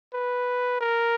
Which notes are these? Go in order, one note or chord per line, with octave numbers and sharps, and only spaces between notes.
B4
A#4